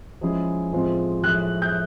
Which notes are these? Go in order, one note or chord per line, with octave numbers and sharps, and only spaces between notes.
F3 G#3 C#4 E4 G#4
A2 F3 G#3 C4 F4
A2 F3 G#3 F#6
G6